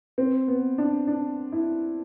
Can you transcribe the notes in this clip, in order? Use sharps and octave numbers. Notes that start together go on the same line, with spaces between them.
C4
B3
D4
D4
E4